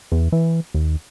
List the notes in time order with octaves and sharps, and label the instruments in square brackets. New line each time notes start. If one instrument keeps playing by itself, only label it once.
[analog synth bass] E2
E3
D#2